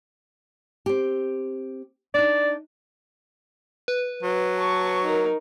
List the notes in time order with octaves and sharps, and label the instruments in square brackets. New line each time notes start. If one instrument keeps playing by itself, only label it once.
[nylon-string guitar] C4 G4
[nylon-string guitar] D4 D#4 [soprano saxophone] D5
[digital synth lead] B4
[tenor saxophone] F#3
[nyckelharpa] A5 C#6
D#4 A#4